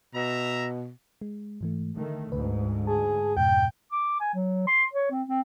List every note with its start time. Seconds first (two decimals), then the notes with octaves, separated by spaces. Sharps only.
0.15 B2 E5 A#5
1.21 G#3
1.61 G#2 E3 A3
1.97 D3 D#3 A3
2.32 D2 G#2 B4
2.87 G#4 A5
3.37 F2 G#2 B2 G5
3.92 D6
4.20 G#5
4.34 F#3
4.67 C6
4.93 C#5
5.11 C4
5.28 C4